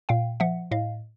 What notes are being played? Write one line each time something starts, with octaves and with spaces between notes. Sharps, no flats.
A#2 F5 G5
F3 E5 F#5
A2 D#5 F5